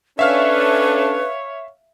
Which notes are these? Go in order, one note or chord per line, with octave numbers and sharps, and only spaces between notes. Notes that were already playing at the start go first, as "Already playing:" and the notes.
C#4 D4 A4 B4 C#5 E5 F5 F6